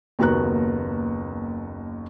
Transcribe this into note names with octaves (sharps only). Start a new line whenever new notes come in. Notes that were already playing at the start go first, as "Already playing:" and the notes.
F#1 D#2 B3 F#4 A#5 F#6